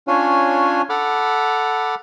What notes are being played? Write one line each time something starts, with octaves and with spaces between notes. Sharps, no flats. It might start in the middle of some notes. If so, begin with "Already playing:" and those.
C#4 D4 F4 C#5 G#5
A4 F#5 B5 D6 F6